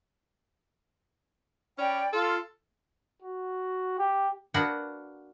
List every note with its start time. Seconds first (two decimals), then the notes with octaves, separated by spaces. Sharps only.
1.78 C#4 D5 G5 B5
2.13 F4 A4
3.22 F#4
3.99 G4
4.54 A#3 B3 D4 F#4 F#5